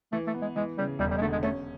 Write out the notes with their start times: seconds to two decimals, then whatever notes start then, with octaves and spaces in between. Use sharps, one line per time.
0.12 E3 A3
0.27 A3
0.34 B3
0.42 G#3
0.56 E3 G#3
0.78 C#3 G3
0.99 E1 G3
1.11 G3
1.17 G#3
1.21 D3 A3
1.32 G#3
1.43 A3 C#4